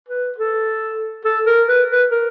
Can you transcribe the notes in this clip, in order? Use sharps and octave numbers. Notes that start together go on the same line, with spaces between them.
B4
A4
A4
A#4
B4
B4
A#4